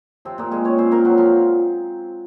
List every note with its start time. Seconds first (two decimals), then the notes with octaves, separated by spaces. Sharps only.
0.25 C3 F3 C4
0.38 A#2 A#3
0.51 A#2 G#3 G#4
0.65 C#4 C#5
0.78 A#2 C4 C5
0.91 A#3 A#4
1.04 F3 F#3 F#4
1.18 F3 F4